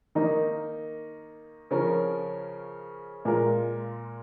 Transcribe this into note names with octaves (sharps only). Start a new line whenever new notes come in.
D#3 A#3 D#4
C#3 F3 C#4 A#4
A#2 G#3 F4 A#4